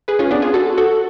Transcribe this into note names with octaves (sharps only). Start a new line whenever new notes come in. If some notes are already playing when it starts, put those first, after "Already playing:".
G#4 B4
C#4 F4
B3 D4
F4 G#4
F#4 A4
F#4 A4